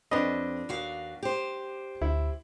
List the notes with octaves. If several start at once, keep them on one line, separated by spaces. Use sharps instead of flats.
F2 C4 D4 B4 D#5
D#2 F#4 F5
G4 C5
D2 E4